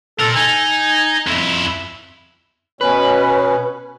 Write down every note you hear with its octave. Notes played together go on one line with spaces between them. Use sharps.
A#2 A4 A#4
D#4 G#5
F2 E4
B2 C#4 B4